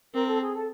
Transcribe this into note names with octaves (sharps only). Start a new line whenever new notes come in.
C4 A#4
A4
G#4
A4